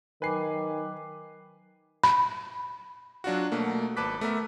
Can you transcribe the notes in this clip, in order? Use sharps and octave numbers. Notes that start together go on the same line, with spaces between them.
D#3 F#3 B4 G5 G#5 D6 C7
B5
F#3 D4 F4 F#4
B2 A3 A#3
G#1 B4 A5 D6 F#6 B6
A3 B3 A#4 E5